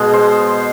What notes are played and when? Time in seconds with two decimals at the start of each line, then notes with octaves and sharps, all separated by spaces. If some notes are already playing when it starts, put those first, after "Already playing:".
Already playing: B2 G#3
0.13 C5